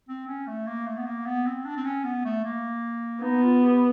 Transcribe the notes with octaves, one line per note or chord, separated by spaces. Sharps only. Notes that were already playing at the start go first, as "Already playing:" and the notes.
C4
C#4
A3
A#3
A3
B3
A#3
B3
C4
D4
C4
C#4
B3
A3
A#3
B3 D#4
F4
G4